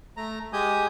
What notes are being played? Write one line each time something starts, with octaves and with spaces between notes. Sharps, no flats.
A3 A#5
G#3 G4 G#5 D#6 G6